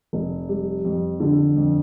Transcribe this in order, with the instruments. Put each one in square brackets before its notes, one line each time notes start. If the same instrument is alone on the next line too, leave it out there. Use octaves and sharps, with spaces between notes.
[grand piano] F1
G3
F2
D3
F2